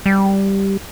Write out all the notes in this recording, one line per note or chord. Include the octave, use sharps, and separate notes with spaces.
G3